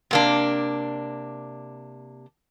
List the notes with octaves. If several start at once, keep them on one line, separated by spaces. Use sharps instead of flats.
C3 A#3 D4